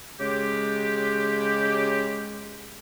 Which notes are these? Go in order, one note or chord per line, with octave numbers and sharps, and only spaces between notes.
C#3 G#3 G4